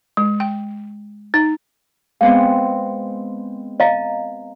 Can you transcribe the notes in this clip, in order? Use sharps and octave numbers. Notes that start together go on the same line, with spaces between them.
G#3
G5
D#4
G#3 B3 C4 F5
D#5 F5 A#5